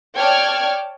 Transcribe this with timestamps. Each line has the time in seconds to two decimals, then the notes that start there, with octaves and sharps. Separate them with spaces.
0.18 C#5 D5 G5 A5 F6 G#6